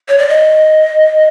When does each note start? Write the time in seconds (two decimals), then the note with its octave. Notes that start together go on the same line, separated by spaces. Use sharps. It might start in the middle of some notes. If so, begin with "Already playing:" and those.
0.09 C#5
0.18 D5
0.29 D#5